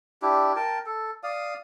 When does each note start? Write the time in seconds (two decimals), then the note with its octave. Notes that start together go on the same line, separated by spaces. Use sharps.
0.22 D4 E4 G4
0.56 A#4 G5 A5
0.86 A4
1.23 D5 F5 D#6